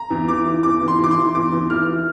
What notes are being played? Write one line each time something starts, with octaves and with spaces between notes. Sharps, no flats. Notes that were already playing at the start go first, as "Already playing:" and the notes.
Already playing: A#5
E2
E3 D6
E3
E2 D6
E2
C6
E3 D6
C6
E3
E2 D6
E2
E3 F6
E3